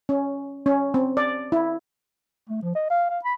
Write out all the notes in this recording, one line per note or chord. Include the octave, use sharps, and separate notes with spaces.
C#4
C#4
C4
D5
E4
A3
F3
D#5
F5
F5
B5